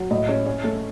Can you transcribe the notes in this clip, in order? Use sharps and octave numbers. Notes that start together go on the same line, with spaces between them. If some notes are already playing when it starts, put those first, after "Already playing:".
Already playing: F#3
A2 D#5
C#4
C#4
A3